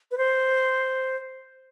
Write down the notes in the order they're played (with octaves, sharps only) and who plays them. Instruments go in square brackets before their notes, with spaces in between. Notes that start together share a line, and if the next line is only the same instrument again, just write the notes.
[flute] B4
C5